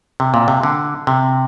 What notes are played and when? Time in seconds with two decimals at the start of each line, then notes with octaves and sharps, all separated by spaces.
0.20 C3
0.34 A#2
0.48 C3
0.63 D3
1.07 C3